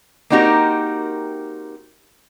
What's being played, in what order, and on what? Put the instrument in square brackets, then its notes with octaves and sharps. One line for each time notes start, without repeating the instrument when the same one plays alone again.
[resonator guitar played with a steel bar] A#3 C4 D#4 F#4 G4 A#4